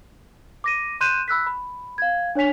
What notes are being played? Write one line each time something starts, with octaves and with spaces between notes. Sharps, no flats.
D6 A#6 D#7
C6 F#6 G6 D#7 E7
B5 E6 F#6 B6
B5
F5 G#6
D4 C#5 G#5 B6 F7